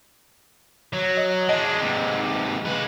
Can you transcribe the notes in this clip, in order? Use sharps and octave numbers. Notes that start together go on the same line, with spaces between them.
F#3
D#5
G#3 D4 D#5
G#2 C3
G#3 B4